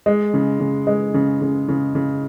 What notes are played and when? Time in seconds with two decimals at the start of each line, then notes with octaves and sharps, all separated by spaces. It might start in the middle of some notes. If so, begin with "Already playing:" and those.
0.06 G#3
0.34 C#3
0.60 C#3
0.87 G#3
1.14 C#3
1.41 C#3
1.68 C#3
1.95 C#3